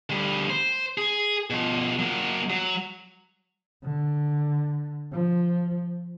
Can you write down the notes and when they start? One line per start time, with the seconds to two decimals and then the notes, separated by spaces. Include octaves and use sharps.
0.10 D2 G3
0.50 C5
0.98 G#4
1.50 B2 F3
1.99 F#3 A#3
2.50 F#3
3.83 D3
5.12 F3